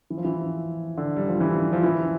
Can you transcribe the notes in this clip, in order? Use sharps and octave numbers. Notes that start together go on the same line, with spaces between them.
E3
F3
E3
D3
G3
F3
E3
F3
E3